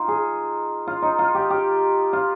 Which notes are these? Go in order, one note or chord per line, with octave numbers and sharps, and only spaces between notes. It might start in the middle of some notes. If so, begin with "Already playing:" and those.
Already playing: D#4 F4
G#4
F4
D#4
F4
G4
G4
F4